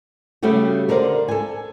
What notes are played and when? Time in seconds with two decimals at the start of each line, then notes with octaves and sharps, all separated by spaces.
0.43 C#3 G3 A3 F#4 G4
0.89 D3 A#4 C5 D5
1.28 A4 G#5